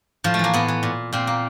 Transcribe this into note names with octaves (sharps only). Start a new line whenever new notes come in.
A2 F3
A3
E3 A#3
A2 B3
E3
A#2
A#2 C4
A#3